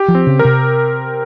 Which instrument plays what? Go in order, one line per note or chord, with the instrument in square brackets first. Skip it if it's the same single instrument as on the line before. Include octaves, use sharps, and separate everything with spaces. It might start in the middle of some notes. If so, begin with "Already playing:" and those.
Already playing: [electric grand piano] G4
[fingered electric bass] F3
[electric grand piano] C4
[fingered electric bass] C#3
[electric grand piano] A#4
[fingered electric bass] C3